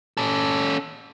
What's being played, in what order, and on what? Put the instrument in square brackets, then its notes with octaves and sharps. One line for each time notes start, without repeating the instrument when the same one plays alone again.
[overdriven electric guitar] C#4 A4